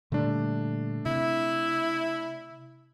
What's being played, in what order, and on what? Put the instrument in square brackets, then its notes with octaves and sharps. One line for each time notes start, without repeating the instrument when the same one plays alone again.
[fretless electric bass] A#2 D3 G3 [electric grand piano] A3 D4
[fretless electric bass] C3 [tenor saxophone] E4